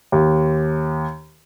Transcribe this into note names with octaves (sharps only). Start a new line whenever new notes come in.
D#2